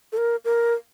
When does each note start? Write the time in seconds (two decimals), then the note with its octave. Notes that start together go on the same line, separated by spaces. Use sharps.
0.12 A4
0.17 A#4
0.45 A#4